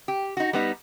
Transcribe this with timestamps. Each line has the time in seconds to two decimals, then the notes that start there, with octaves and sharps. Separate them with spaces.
0.08 G4
0.37 D#4 F#4
0.53 G3 B3 D#4